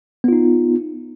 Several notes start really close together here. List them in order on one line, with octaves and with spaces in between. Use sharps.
B3 F4 D#4